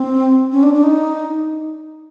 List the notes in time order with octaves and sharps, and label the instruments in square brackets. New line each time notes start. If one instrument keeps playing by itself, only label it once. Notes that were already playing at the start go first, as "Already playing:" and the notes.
Already playing: [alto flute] C4
C#4
D4
D4
D#4